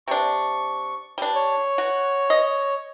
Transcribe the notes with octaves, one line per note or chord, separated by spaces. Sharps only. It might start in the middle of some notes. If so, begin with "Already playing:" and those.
C3 D4 C#6
G3 D4
C#5
F#4
D#5